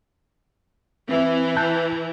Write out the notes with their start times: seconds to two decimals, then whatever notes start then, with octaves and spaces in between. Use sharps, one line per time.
1.09 E3 C4 E5
1.57 A5 F#6 G6